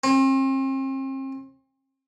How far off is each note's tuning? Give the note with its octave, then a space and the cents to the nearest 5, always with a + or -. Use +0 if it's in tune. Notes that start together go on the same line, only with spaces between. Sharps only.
C4 +40